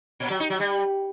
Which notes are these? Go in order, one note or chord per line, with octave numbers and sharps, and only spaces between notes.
A#2
F#3
D#4
F#3
G3